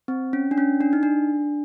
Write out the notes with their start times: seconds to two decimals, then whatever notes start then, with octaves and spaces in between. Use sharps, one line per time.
0.08 C4
0.33 C#4
0.51 D4
0.58 C#4
0.81 D4
0.93 D#4
1.03 D4